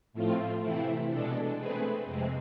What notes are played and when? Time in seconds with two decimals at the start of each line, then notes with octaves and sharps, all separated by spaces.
0.13 A2 F3 A3 C4 F4
0.62 C3 E3 A3 C4 E4
1.10 B2 G#3 D4 A4
1.57 A3 C4 G#4 B4
2.05 F2 C3 G#3 C4